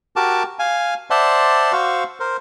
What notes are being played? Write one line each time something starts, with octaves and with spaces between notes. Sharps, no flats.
F#4 G4 A#4 A5 D6
F5 G#5
C5 D5 E5 F#5 A5 C6
F#4 C5 F5 C#6 E6
A#4 C5